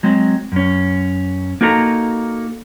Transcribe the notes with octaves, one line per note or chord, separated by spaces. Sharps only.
F#3 G#3 C4
F#2 C#4
A#3 D#4 F#4 A4 D#5 A#5